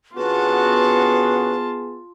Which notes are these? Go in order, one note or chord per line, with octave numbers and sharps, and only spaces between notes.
D3 B3 C#4 F4 F#4 G#4 B4 A5